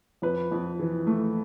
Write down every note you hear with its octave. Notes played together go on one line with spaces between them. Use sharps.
F2 B4
F2
E3
A3